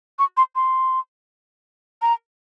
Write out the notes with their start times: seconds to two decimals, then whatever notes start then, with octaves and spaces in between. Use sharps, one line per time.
0.19 C#6
0.37 C6
0.55 C6
2.02 A#5